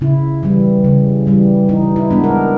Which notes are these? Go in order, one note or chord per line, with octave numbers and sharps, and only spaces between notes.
C#3 E4
E3 G3
C#3
E3 G3
E3 D#4
E4
G#3 B3 D4
A#4